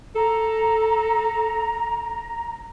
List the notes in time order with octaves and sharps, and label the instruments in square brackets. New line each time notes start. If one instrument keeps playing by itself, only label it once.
[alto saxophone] A4 [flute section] A#5